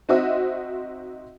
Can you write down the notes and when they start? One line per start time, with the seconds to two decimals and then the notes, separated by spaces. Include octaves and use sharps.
0.09 C4 D#4 F#4 C5 D#5 E5